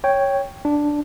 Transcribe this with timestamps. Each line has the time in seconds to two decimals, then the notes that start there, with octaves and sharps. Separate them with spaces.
0.04 C#5 G5
0.65 D4